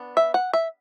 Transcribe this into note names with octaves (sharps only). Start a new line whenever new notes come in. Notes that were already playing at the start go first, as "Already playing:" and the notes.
Already playing: B3 D4
E5
F#5
E5